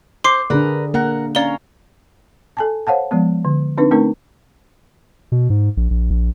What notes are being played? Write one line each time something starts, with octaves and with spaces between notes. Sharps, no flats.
C5 C6 D6 C7
D3 D4 G#4 A#4 B4 D5
A#3 A#4 F#5
C#4 D5 F5 A#5 G7
A4 G#5 A5
C5 C#5 F5 F#5 A5
F3 G#3 B3
D3
C4 D4 D#4 B4
A3 C4 C#4 D#4 A#4
B2
G#2
A#1
A#1
A#1